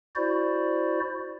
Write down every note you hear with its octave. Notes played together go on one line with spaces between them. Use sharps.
E4 F#4 C5 D5